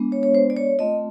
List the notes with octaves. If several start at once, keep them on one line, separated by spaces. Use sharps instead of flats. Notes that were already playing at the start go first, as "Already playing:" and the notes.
Already playing: G#3 B3 D4
C#5
C#5
C5
D5
C#5
A3 C4 F4 D#5